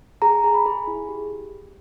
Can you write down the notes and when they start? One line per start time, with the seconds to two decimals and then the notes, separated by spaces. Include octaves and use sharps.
0.22 G#4 A#5
0.44 G#4
0.54 B5
0.66 G#4
0.87 E4
1.09 G4